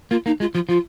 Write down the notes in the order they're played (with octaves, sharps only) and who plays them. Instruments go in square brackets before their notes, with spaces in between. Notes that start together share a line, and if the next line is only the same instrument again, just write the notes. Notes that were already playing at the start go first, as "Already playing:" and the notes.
[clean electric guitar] A#3 [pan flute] F4
[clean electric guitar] A#3 [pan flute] D#4
[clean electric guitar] G#3 [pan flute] F4
[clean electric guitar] F3 [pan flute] F4
[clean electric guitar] F3 [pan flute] F4